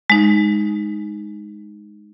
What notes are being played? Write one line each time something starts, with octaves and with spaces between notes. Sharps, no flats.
G#3 D#4